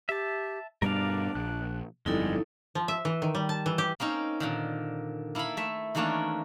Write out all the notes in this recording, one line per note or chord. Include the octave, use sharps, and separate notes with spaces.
G4 E5 A5
G2 B2 G3 D4 A#4 D5 F5
A#1 F#6
G1 F2 G3 G#3 D#4 E4 A4
F3
E5
E3
D#3
G3
A5
E3
G4
A#3 C4 C#4 D#4
A#2 D3 D#3
A#3 E4 A4 F5 B5
A3 E5
D#3 E3 A3 A#3 C#4 D4